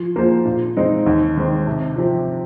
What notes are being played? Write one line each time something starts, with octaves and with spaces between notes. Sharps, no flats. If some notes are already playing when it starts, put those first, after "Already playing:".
Already playing: F3
A#3 F4 G#4 C5
A#2
G#3 C4 D#4
D#2
D#3 G#3 C4
C3
F3 C4 G4